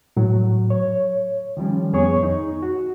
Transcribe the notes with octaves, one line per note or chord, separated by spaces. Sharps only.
A2 F#3
C#5
D#3 F3 G3 C#4
F2 B3 G#4 C#5 C#6
D#4
F#4